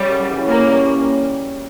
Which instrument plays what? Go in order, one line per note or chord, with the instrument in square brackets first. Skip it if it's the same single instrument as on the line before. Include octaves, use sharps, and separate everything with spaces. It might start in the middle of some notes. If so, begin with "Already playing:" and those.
Already playing: [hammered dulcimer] C#3 [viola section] G3
[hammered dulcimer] F#2
C#3 E3
[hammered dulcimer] C#3 [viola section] A#3
[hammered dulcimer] G3 C#4 G4
C#3